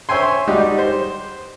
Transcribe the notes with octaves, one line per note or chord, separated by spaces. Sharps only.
C5 C#5 E5 G5 G#5 C6
G3 G#3 D#4 F#4 G4
C5